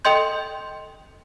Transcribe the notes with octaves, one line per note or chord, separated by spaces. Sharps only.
A4 D#5 G5 C6 G6